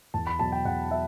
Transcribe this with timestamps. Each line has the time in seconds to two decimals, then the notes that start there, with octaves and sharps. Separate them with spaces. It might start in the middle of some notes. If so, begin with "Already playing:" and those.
0.14 E2 A5
0.27 B5
0.39 B2 F#3 A5
0.52 G5
0.65 E2 F#5
0.91 F#3 E5